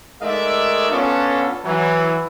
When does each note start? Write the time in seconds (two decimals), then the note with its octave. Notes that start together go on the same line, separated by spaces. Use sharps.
0.22 G#3 A3 D#4 A#4 D5 E5
0.90 B3 C#4 D4 F4 A4
1.65 E3 F#3